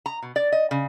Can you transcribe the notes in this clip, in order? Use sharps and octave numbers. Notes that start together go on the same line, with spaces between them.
A#5
B2
D5
D#5
C#3